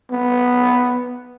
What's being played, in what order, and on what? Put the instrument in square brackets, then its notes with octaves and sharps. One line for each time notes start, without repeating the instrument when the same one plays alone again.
[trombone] B3